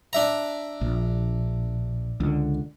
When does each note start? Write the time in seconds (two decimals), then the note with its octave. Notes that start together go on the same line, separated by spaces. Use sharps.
0.13 D4 E5 A#5
0.81 A#1
2.20 C#2 D3